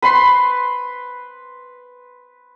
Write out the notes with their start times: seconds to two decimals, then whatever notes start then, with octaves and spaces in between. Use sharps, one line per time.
0.02 B4 B5 C6